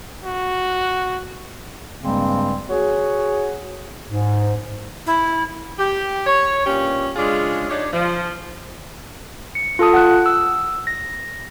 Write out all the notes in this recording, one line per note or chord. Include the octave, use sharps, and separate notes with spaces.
F#4
G2 C#3 G3 G#3 A#3 C4
F#4 G#4 C#5
G#2
E4
G4
C#5
G2 A#2 C#4 G4
C#3 G#3 D4 F4 G#4
D4 D#4 G4 C#5
F3
C#7
F4 A4 A5 D#6
F#5 F#6
E6
A#6